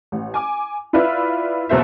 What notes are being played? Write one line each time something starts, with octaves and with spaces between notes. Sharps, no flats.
A1
G#5 D6
E4 F4 B4 D5 E5
F#1 E2 B2 C5 E5